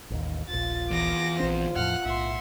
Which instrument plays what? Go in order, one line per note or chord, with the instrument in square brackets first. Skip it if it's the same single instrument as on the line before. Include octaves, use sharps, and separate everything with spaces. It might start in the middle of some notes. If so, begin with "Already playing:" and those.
[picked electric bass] A1 D#2
[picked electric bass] D#1 A#1 [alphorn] F4 [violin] A6
[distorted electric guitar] E2 [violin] D6 A#6
[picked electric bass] A#1 C4 [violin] C5
[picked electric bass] E2 A2 F3 [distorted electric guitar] F#5 [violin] F6 F#6
[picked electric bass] B1 A2 [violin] E5 C6